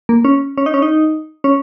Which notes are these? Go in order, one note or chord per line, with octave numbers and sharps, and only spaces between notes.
A#3
C#4
C#4
D#4
C#4
D#4
C#4